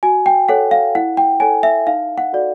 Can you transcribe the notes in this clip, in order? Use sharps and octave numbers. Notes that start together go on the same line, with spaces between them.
F#4 G#5
G5
A4 C#5 F#5
F5
E4 F#5
G5
A4 C#5 G#5
E5
D#4 F5
F#5
F#4 A4 D5